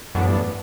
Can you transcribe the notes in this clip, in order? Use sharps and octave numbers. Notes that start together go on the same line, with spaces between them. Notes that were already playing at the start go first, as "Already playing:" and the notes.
F#2 A2 E3 B3 D4
G2